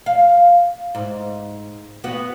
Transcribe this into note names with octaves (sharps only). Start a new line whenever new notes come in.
F5
G#2
B3 F#4